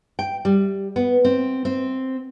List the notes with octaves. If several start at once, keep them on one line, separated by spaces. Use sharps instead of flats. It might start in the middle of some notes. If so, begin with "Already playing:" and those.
G5
G3
B3
C4
C4